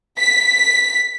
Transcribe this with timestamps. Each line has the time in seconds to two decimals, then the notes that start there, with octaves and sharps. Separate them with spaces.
0.20 B6